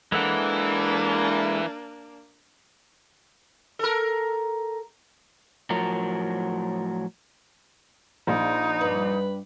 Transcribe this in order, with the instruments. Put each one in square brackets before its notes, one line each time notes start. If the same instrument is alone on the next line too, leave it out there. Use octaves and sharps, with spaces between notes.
[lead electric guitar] E3 [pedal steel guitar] G#3 A4 F#5 [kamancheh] A#3 D4
[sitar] A4 A#4
[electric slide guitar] A2 F3 F#3 F#4 A#4
[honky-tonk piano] A#1 [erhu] D#4
[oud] G2 D5 [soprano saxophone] B4